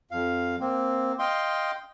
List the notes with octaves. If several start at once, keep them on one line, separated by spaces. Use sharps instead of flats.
F2 F5
A#3 C4
D#5 F5 G5 C6